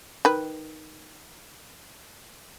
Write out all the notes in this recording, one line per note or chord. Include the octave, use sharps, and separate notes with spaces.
D#3 B4